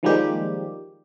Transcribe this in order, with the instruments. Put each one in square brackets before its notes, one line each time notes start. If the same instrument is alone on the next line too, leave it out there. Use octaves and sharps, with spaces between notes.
[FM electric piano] D#3 F3 G3 G#3 A#3 G4